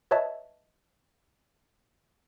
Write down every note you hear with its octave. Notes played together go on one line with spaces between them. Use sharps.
B4 C#5 D#5 E5 A5